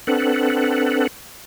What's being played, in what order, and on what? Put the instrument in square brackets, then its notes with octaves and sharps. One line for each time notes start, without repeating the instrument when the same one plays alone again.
[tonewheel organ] C4 D4 A4 B4 F#5